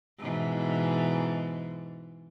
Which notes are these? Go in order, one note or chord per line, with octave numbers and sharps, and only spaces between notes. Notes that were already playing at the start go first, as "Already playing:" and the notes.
G#2 B2 E3